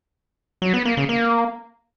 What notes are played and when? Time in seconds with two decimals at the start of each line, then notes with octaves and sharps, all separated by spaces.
0.62 F#3
0.74 B3
0.85 A#3
0.97 C#3
1.09 A#3